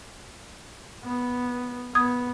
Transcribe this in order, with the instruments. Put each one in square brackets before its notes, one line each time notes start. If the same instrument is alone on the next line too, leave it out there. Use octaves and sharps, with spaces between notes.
[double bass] B3
[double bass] B3 [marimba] D#6 G#6